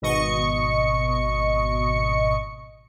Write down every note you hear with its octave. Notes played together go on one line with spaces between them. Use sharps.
G#1 B2 D#5 C#6 C#7